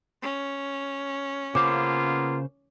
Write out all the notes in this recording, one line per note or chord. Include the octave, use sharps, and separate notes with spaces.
C#4
C#3 A#3 B3 F4 C5 F5 D6